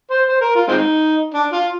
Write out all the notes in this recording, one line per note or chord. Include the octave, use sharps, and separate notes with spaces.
C5
C5
A#4
F4
G#3 C4 D#4
D4
F4